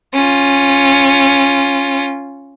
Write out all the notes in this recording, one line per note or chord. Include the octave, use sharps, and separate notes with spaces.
C#4 F4